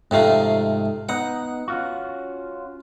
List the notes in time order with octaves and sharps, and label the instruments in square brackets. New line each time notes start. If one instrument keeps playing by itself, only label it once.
[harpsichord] F2 C3 A3 [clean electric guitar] G#2 D#4 F5
[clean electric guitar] B3 D#4 [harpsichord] F#5
[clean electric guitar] C#4 F4 F#4